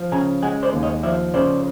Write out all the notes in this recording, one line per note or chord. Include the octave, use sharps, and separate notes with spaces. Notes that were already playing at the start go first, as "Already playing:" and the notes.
Already playing: F3
C#3 G#5 A#5
G#3 F#5 G#5
C5 D5
D#2
C#5 D#5
F3 D5 E5
C#3 C5 D5